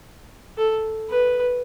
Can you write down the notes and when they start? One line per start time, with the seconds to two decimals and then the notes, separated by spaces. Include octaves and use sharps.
0.58 A4
1.10 B4